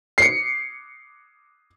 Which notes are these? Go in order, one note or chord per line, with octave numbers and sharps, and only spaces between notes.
C7 C#7